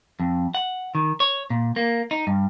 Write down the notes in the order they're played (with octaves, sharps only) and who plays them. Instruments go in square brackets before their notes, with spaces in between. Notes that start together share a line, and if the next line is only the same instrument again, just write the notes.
[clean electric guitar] F2
F#5
D#3
C#5
A#2
A#3
D#4
G2